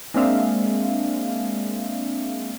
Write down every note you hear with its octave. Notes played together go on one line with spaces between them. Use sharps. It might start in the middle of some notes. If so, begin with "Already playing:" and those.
G#3 A#3 C4 D4 E5 F5